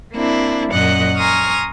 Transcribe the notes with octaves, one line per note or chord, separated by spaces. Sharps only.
A#3 C4 D4 E4
F#2 A#2 D#5 F#5 F#6
G#5 A#5 C6 C#6 D#6 F6